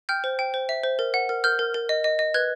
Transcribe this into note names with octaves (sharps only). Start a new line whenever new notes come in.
G5 F6 G6
C5
G5
C5
E5
C5
A#4
F#5
A#4
A#4 F6 G6
A#4
A#4
D#5
D#5
D#5
B4 F#6 G#6